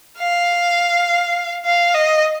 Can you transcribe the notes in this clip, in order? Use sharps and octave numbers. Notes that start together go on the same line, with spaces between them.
F5
F5
D#5